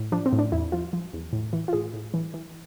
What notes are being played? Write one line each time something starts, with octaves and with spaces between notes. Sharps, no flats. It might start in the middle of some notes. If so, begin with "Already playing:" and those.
Already playing: A2
F3 D4
C4
A2
D4
E2 E4
F3 F4
F3
E2
A2
E3
F4
A2 G#4
A2
E3
E3